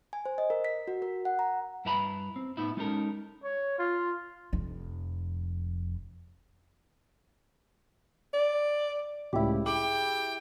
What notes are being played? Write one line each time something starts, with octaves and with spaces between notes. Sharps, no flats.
G#5
C5
D#5
A#4
B6
F#4
A#4
F#5
A#5
G2 E4 B4 E5 A#5 B5
C4
A2 B3 D#4 E4
G#3 C#4 D#4 G4 A4 A#4
C#5
F4
F1 F2
D5
C#2 A2 E4 G4
G#4 G5 D6 F#7